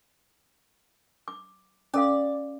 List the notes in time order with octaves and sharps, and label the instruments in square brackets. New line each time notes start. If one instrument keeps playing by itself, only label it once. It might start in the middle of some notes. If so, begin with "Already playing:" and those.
[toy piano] D6
[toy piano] C#4 A4 F5 [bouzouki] D5